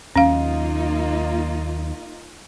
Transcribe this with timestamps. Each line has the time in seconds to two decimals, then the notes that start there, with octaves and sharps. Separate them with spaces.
0.16 D#2 F#3 A#3 C#4 D#4 F4 F5